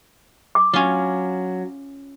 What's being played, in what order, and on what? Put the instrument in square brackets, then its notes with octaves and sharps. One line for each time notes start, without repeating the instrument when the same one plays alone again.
[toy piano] D6
[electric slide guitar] F#3 [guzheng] C#4 F4